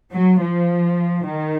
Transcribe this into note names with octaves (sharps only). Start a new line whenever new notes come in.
F#3
F3
D#3